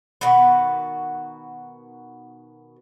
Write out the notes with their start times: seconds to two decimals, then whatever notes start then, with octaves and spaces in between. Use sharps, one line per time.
0.21 B2 D#3 F#4 B4